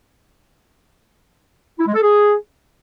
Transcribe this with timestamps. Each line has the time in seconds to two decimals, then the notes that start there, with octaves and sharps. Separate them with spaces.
1.79 E4
1.87 G#3
1.95 A4
2.03 G#4